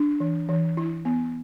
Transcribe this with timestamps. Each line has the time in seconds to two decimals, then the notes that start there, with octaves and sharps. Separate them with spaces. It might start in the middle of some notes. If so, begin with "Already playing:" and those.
Already playing: D4
0.20 E3
0.49 E3
0.77 E4
1.05 B3